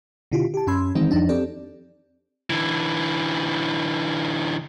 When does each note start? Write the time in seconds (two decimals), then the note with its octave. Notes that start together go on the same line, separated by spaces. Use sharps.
0.32 B2 D3 E4 F4 G4
0.54 G4 A5
0.67 F#2 C#4 B5 C6 E6 G#6
0.95 D#3 E3 G#3 C4 D#4
1.11 F2 F3 D4 D#4
1.29 C4 G4 A4 D5
2.50 D3 E3